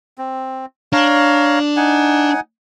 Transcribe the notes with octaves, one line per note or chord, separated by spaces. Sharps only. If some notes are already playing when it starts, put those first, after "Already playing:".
C4
D4 C#5 F5 A#5
D#4 F#5 G#5